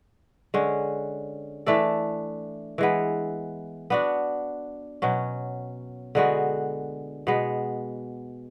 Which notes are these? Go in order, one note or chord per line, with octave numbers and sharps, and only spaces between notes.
D3 G#3 C#4
E3 A3 D4 A4
E3 G#3 B3
B3 D4 F#4
B2 F#3 C#4
D3 G#3 B3 F#4
B2 G#3 B3